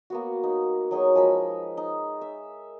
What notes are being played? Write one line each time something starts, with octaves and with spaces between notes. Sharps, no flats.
A#3 B3 F#4
D#4
F#3 D#4 G#4 C#6
F3 G#3 A#4 B5
D#4
E5